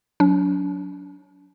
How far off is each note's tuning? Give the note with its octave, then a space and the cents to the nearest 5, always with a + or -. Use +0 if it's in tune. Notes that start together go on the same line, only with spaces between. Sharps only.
F#3 -15 D4 -40